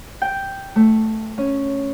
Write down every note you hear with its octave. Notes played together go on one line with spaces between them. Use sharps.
G5
A3
C#4